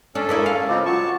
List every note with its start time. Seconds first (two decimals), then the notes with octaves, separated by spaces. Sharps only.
0.15 C#4 D4 A4
0.29 G#3 A#3 E4
0.46 F5
0.69 C#3 G#3 C4 F4 D6
0.86 F#3 A5 C#6